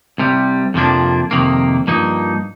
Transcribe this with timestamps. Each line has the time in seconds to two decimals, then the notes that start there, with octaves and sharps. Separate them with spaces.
0.18 C2 C3 G3
0.74 F2 C3 F3 A#3 D4
1.31 F2 C3 D#3 A#3
1.87 G2 F3 A#3 D#4